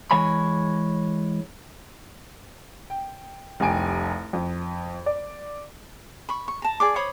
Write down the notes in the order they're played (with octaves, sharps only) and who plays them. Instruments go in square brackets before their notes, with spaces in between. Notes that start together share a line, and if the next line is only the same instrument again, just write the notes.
[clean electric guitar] E3 G#3 C#5 G#5 B5
[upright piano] G5
F1 C2 G4 G#5 D7
F2
D5
[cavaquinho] B5 C#6
C#6
A5 A#5
G#4 D5 D6
C5 C#5 B5 D#6